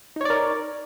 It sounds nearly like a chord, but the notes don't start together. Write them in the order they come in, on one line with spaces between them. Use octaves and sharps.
D#4 C#5 D5 A#4